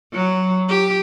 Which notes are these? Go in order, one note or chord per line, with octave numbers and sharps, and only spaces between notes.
F#3
G4